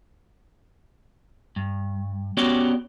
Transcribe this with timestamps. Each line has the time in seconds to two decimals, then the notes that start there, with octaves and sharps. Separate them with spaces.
1.56 G2
2.37 B3 C#4 F#4 G4 C#5 D5